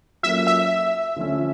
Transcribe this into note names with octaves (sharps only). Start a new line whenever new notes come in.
F#3 A#3 C#4 F4 A4 E5
E5
D3 F3 A3 C#4